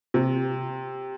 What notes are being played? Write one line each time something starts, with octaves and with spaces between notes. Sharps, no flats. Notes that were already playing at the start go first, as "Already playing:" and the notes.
C3